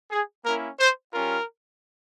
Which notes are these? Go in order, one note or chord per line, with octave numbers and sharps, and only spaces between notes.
G#4
A#3 C#4 E4 A#4
C5
G3 C#4 F4 A#4